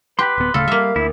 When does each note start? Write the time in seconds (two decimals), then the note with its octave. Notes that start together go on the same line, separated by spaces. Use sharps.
0.19 G4 B4 B5 C6
0.38 D1 B3
0.54 D1 C#3 A3 A4 F5
0.68 G3 A#3 E5
0.96 D2 E4